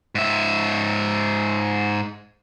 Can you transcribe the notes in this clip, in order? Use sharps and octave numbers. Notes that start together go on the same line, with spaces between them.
G#2 E5